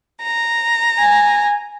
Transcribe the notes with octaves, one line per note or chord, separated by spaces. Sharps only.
A#5
G#5